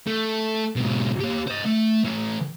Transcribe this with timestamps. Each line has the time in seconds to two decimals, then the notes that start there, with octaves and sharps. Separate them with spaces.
0.07 A3
0.76 G#2 B2
1.20 A#3 G4
1.47 C5 D#5
1.65 A3
2.05 A2 E3